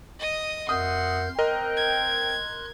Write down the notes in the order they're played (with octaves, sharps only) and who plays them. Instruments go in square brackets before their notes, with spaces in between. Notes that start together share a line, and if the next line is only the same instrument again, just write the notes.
[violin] D#5 D#6
[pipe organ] F2 A#4 G6 [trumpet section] F#4 E5 F#5 [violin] C6 [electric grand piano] D#6
[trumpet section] C4 G5 [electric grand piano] A#4 D#5 [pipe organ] C6 F#6
[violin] G#6